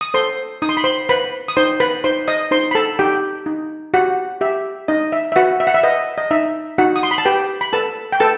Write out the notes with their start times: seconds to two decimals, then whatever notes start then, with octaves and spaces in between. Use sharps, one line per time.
0.01 D#6
0.14 A4 C5 C6
0.62 D#4 D#6
0.69 C6
0.77 B5
0.84 C5 C6
1.09 B4 C5 B5
1.48 D#6
1.57 D#4 C5 C6
1.80 B4 B5
2.04 D#4 C5 C6
2.28 D#5 D#6
2.51 D#4 C5 C6
2.71 B5
2.75 A4 A5
2.99 D#4 G4 G5
3.46 D#4
3.94 F#4 G4 F#5
4.41 G4 E5
4.88 D#4 D#5
5.12 E5
5.32 E5
5.36 F#4 B4 F#5
5.60 E5
5.67 F#5
5.74 E5
5.83 B4 D#5
6.18 D#5
6.31 D#4 E5
6.78 D#4 F#4 F#5
6.96 D#6
7.03 C6
7.11 B5
7.18 A5
7.25 G4 B4 G5
7.61 B5
7.73 A4 B4 A5
8.12 G5
8.20 A4 B4 A5